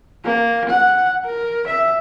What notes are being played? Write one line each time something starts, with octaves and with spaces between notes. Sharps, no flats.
A#3
F#5
A#4
E5